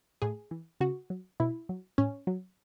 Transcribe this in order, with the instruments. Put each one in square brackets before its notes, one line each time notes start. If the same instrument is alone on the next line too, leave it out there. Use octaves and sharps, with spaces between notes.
[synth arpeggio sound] A2 G#4
E3
C#3 F#4
F#3
B2 E4
F#3
A2 C#4
F#3